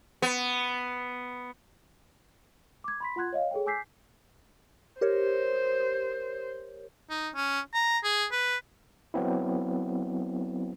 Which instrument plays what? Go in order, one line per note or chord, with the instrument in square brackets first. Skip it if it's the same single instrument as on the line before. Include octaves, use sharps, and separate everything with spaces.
[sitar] B3
[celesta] D6 G#6
B5 C6 B6
F4 F#5 C6 F#6 G#6
C#5 D#5 F5
G#4 A4 C#5 G5
G#5 D6 E6 G6 B6 C7
[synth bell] G4 A#4 C#5 [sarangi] C5
[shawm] D#4
C#4
A#5
G#4
B4
[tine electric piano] F#3 B3 C4 E4